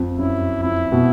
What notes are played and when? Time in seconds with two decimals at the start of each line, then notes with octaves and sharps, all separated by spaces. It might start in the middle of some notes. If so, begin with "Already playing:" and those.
Already playing: F2
0.18 F#2 E4
0.63 F2 E4
0.92 B2